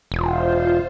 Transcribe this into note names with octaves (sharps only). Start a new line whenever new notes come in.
E1 F4 C5